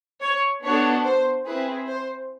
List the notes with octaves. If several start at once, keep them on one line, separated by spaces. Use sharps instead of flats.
C#5
B3 D4 F#4 A4 C#5
C5
C4 E4 G#4 B4
C5